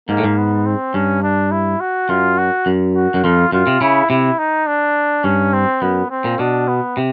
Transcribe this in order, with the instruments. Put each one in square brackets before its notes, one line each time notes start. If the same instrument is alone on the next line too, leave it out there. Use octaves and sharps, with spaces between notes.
[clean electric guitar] G#2 [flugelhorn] A#3
[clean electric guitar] A2
G#2
[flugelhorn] B3
C4
[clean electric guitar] G2 [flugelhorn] C#4
[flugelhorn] D4
E4
F#4
[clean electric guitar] F#2 [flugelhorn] F4
[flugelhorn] F#4
[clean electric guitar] F#2
[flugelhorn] F#4
[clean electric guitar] F#2
[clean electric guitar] F2 [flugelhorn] F4
[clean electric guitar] F#2 [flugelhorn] F4
[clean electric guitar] C3
[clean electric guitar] C#3 [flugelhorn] E4
[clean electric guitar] C3 [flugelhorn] E4
[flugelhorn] D#4
D4
[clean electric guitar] G2 [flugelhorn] C#4
[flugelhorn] C4
[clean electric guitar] F#2 [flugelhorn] B3
[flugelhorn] C4
[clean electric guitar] A#2
[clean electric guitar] B2 [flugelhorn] D4
[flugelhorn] B3
[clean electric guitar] C3